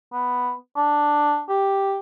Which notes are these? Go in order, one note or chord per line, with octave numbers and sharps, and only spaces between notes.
B3
D4
G4